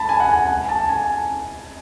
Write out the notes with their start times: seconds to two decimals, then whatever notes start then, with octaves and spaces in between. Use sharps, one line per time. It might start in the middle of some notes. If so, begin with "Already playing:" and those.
Already playing: A5 B5
0.09 G#5
0.20 F#5
0.32 G#5
0.69 A5
0.89 G#5